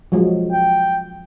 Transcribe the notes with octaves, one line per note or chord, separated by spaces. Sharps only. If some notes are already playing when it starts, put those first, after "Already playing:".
F3 F#3 G#3
G5